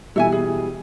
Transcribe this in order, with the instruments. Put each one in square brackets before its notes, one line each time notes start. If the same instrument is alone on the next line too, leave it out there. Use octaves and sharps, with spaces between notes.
[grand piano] B2 E3 G3 [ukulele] A4 E5 G#5
[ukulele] G#4